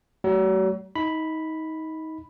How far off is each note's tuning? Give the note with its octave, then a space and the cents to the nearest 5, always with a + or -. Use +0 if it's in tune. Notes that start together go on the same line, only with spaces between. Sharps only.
F#3 +40 A3 -5
D#4 +25 B5 +0